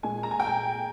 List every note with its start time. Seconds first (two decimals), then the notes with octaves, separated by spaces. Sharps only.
0.03 A#2 G#3 G#5
0.23 A#5
0.31 G#5
0.40 G5
0.47 G#5